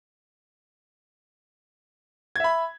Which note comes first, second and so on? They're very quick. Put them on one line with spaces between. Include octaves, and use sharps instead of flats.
G#6 E5 B5